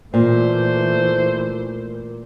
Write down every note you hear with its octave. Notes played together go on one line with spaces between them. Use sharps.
A#2 E3 A3 C5